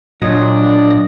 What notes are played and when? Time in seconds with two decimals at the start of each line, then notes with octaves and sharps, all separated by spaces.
0.22 A#2 F#3 D4 D#5 D#6